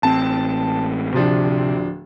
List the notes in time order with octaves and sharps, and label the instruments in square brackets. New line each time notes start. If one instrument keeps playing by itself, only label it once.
[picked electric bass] A1 C4 [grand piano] A5
[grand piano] D1 F3 D4 [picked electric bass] C3